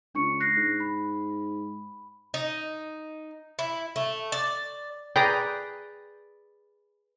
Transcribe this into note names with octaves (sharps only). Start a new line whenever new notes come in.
C#2 D4 C#6 C#7
F#6 A#6 C7
G#2
B5
D#4
E4
A3
D5
G#4 B4 D5 G5 A#5 D#6